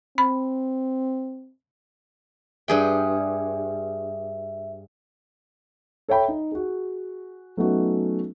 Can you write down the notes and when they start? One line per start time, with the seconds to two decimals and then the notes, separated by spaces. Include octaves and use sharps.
0.18 C4 B5
2.68 G2 G#4 E5 G5
6.08 A4 C#5 E5 G5 B5
6.28 D#4
6.52 F#4 G#4
7.57 F#3 A3 B3 C#4 D#4 F#4